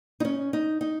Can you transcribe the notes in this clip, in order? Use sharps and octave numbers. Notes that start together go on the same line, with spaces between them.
D#4
C#4
D#4
D#4